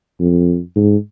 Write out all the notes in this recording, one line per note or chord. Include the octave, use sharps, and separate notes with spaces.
F2
G#2